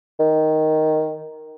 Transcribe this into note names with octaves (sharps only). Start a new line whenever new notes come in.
D#3